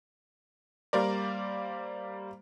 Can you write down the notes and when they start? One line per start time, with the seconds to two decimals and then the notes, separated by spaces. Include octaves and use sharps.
0.93 G3 A#3 A#4 C5 D5